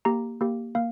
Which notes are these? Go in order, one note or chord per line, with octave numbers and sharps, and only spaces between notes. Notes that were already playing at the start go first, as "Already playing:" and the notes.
A#3 G4 A#5
A#3 G4
A#3 F5